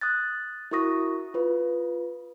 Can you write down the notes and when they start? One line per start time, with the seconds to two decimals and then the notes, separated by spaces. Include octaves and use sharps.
0.01 D#6 F#6 A6
0.71 E4 F#4 A#4 C#6 D#6 A#6
1.34 F4 B4